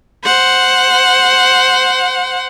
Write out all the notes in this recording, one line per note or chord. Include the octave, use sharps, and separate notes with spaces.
C5 F#5